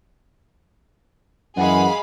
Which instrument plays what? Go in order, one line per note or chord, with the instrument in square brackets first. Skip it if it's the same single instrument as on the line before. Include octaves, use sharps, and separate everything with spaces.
[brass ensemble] F#2 E3 [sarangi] G#3 [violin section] G#4 F5 B5 [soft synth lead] F#5